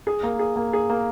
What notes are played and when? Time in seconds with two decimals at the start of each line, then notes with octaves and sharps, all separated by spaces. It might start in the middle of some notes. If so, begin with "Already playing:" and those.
0.07 G#4
0.23 A#3
0.39 G#4
0.56 A#3
0.73 G#4
0.89 A#3